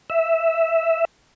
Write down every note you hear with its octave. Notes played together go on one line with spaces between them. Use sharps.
E5